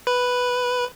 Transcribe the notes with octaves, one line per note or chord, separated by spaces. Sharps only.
B4